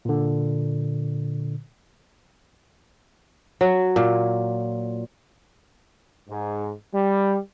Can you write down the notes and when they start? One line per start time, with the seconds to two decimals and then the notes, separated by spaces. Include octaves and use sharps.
0.05 A#2 D3
3.61 F#3
3.96 A#2
6.29 G#2
6.93 G3